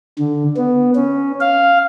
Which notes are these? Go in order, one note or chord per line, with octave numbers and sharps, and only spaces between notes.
D3
B3
C#4
F5